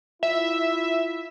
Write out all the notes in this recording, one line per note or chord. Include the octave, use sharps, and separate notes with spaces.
E4 F4 E5